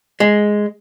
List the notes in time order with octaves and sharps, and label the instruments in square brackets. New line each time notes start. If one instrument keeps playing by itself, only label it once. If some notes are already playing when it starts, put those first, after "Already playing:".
[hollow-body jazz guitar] G#3